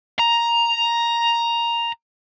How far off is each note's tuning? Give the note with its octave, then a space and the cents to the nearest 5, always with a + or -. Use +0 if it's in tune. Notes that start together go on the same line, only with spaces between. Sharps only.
A#5 +5